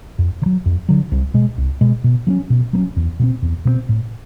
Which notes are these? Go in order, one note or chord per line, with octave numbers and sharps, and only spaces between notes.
F2
D3
F#3
F2
D3 F#3
C2
B2 G#3
C2
B2 G#3
B2
F#3 A#3 C#4
B2
F#3 A#3 C#4
E2
B2 G#3 C4
E2
B2 G#3 C4
A2